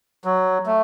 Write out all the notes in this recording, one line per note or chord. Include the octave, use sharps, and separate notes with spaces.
F#3
A3